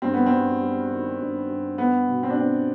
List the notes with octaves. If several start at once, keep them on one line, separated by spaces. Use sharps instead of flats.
G2 C4
B3
C4
G2
G3
D#3
G2
G2
B3
B2
C4
D4
B3 C4